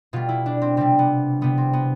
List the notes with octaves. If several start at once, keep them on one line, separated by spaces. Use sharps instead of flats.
B2 G3 F4
E4
D4
C4
C3 G3 C4
B3
C3 G3 B3
C4
B3